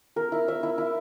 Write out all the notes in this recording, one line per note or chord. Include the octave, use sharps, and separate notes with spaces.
A#4
E4
E5
E4
E4